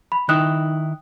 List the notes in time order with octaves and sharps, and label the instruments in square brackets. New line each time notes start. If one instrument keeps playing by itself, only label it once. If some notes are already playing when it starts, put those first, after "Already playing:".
[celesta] B5
[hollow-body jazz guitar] D#3 D#4 E4 [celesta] G5 D#6 F#6